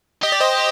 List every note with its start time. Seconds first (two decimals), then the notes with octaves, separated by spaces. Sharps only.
0.22 G4 D#5
0.32 D5
0.40 C5 D#5